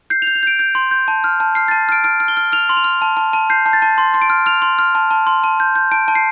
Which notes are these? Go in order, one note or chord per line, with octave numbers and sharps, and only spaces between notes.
G6 C7
F7
G6
F7
G6 D7
G6
C6
G6
A5
F6
A5
F6 C7
A5 A6
F6 D7
F6 D7
F6
G7
F6
F6 F7
C6
F7
F6
A5
A5
A5
G6 C7
A5
A6
A5
C6
C6
D7
F6
F6 F7
C6
F6
A5
A5
C6
A5
G6
G6
A5 D7
A5
C7